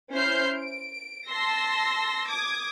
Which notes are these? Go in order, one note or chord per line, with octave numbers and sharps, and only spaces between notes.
C#4 E4 C5 F6 G6 C7
D7
A5 C6 E6 A#6
D6 D#6 G#6